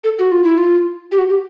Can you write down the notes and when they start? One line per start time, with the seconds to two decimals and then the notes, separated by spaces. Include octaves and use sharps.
0.04 A4
0.19 F#4
0.32 F4
0.44 E4
0.58 F4
1.12 G4
1.18 F#4
1.30 G4